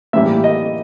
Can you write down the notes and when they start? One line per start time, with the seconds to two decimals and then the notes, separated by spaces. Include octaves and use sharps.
0.13 A2 E3 G3 A#3 E5
0.44 D#5